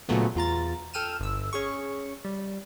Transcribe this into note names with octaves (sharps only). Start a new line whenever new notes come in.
A#2 C#3 F3 F#3 A3 B3
E2 F4 A#5 A6
A4 G5 F6 D#7 E7
G1 E6
C#4 G#4 C#6
G3